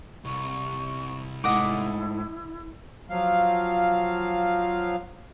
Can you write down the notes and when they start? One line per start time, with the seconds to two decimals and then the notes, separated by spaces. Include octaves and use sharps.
0.24 C2 C#6
1.44 G#2 A3 E4 D#5 F#5 D6
3.10 F3 F#3 F5